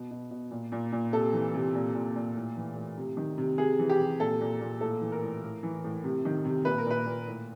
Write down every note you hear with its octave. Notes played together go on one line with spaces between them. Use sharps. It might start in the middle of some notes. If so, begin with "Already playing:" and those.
Already playing: B2
B2
B2
A#2
A#2
A#2
C3 A4
E3
C3
A#2
A#2
A#2
A2
E3
A2
C3
D#3
C3
C3 G#4
E3
G4
C3
A#2 A4
A#2
A#2
A2 A4
E3
A#4
A2
A2
E3
A2
C3
D#3
C3
A#2 B4
A#4
A#2 B4
A#2
A2